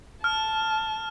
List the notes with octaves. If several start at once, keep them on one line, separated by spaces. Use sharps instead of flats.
A5 F6